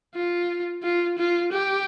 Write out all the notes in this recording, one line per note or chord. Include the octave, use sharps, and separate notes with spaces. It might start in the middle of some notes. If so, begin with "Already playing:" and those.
F4
F4
F4
G4